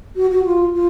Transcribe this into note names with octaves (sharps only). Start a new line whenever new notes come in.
F#4
F#4
F4
F4